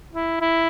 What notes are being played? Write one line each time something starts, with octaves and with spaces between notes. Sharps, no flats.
E4
E4